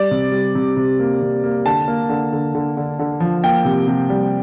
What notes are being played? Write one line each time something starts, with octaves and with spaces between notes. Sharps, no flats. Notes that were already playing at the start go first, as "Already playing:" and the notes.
Already playing: G3 D5
C3
G3
C3
C3
A#3
C3
A#3
D3 A5
A#3
D3
D3
D3
D3
D3
F3
A#3 G5
C3
C3
G3